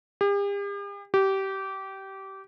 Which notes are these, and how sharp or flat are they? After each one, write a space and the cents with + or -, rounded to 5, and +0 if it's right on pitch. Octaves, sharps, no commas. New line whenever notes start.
G4 +45
G4 -20